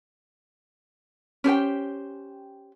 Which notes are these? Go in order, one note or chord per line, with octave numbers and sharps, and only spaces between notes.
C#4 G4 C5 G5